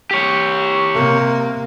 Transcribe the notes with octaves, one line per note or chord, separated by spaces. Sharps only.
G4 C#5
C3 A#3